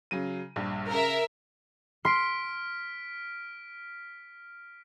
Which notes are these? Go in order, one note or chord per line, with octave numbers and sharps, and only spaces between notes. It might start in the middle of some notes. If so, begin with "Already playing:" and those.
C#3 F#3 D#7
A#1 G2
C#3 A#4 E5
C6 F6 B6 D7